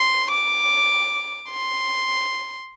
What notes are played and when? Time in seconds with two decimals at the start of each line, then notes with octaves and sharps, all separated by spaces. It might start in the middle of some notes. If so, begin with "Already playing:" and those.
Already playing: C6
0.32 D6
1.50 C6